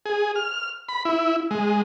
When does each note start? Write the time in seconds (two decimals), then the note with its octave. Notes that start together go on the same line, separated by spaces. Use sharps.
0.06 G#4
0.36 F6
0.89 B5
1.05 E4
1.51 G#3